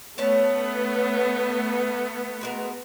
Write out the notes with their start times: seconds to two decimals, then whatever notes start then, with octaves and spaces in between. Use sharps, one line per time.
0.18 A3 B3 C#4 C#5 A5
2.41 G#3 F#4 A#4